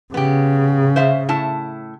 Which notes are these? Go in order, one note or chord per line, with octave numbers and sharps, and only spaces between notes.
C#3 B3 G4
C5 E5 F5
A2 E4 A5